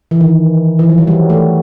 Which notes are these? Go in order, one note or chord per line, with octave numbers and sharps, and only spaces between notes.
E3
D#3
E3
F3
F#3
G3
A3